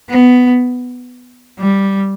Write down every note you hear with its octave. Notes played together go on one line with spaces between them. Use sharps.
B3
G3